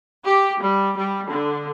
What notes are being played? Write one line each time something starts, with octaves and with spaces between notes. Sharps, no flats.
G4
G3
G3
D3